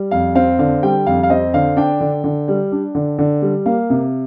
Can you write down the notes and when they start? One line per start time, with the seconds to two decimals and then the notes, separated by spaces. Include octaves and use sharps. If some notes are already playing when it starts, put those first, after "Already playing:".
Already playing: G3
0.11 F2 F5
0.35 C4 F5
0.59 D3 F5
0.82 G3 G5
1.06 F2 F5
1.23 F5
1.30 C4 D#5
1.54 D3 F5
1.77 D4 G5
2.00 D3
2.24 D3
2.48 G3
2.72 D4
2.95 D3
3.18 D3
3.42 G3
3.66 A#3 F5
3.90 C3